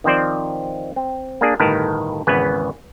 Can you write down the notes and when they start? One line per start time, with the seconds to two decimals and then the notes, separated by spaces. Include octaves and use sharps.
0.04 D#3 F3 C4 C5 D5
0.96 C4
1.41 A#3 D4 G#4
1.59 G1 A2 D#3 A#4 B4 A5
2.27 G#1 E2 C#3 B3 B4 G#5